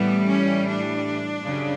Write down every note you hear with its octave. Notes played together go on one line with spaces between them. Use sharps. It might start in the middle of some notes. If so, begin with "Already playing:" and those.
Already playing: A2 E3 G3 B3
C#4
D4
F#2 C#3 G3